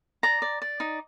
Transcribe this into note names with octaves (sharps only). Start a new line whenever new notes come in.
D5 A#5
D5
D5
D#4